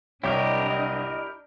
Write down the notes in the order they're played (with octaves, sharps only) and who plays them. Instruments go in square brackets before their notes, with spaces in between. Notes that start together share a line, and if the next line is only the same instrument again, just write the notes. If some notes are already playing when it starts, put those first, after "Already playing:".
[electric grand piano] C2 C#5 G5 [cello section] D4 D#5 [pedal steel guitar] E4 G4 A#4